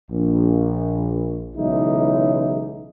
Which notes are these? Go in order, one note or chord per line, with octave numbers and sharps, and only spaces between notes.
A#1
B1 C#3 E3 G#3 D#4 E4